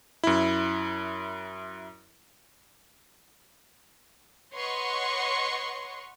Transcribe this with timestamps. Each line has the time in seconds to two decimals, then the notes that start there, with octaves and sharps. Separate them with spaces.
0.24 F#2 E4
4.54 B4 C#5 D#5 F#5 C6 C#6